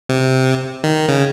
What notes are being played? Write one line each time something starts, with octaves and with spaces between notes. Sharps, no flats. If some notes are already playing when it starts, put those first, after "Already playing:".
C3
D#3
C#3